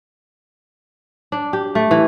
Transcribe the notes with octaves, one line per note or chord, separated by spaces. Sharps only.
D4
G4
A3
E3